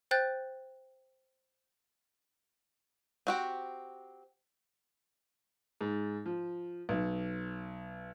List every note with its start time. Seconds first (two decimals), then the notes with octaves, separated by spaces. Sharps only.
0.11 C5 G5 F#6 G6 A6
3.27 C4 F#4 G4
5.81 G#2
6.26 F3
6.89 B1